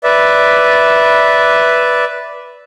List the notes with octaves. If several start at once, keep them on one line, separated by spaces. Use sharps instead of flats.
B4 D5 E5